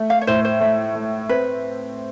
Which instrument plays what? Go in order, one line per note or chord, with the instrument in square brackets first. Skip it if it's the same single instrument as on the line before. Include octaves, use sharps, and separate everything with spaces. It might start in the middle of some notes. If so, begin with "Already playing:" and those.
Already playing: [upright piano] A3
[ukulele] F5
C#5
[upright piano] A2 [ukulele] C5
[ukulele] C5
[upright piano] A3
A3
[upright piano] C4 [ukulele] B4